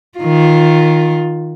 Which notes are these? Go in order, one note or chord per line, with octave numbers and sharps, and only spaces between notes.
D#3 F4